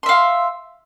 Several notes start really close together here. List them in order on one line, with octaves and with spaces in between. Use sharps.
C6 E5 F5